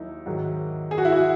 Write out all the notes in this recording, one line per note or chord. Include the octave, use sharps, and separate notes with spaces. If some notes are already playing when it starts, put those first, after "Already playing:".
Already playing: D#2 D#3 F#3 D#4 E4
G#2 D#3 F#3
G#4
F#4
E4
F#4